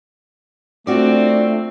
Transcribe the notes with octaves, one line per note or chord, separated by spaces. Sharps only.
A3 C4 D4 F4 F#4 D5